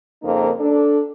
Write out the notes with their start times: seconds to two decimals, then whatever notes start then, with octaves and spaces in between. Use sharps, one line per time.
0.23 F2 C#3 A#3 C4 D#4 A#4
0.59 D4 A4